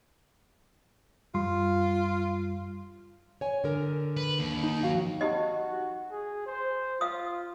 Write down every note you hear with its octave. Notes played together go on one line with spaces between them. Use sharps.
F#2 G3 F4 C6
C#5 G#5
D3 A#4
B4
D#2
D#4
F#3 F#4 F5
D#4 F#4 G4 D#5
G#4
C5
F4 F5 D#6